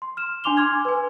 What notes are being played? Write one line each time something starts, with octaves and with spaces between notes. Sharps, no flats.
C6
F6 E7
D4 G#5 C6 D6 F7 G7
C6 D6 F6 G#6
B4 G#5